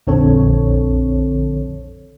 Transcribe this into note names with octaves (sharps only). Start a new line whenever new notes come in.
A#1 F2 D3 C4 A4 C#5